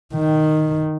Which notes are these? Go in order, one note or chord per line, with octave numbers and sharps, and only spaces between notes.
D#3